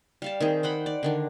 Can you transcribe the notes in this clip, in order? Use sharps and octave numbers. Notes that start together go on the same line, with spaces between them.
G3 F5 A5
D#3 C4 G#4
C5 F#5 G5 B5
D5
D3 D#3 D4